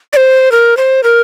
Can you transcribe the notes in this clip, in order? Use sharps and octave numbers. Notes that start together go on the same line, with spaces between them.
D5
C5
A#4
C5
A#4